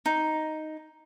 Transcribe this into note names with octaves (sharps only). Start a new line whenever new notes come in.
D#4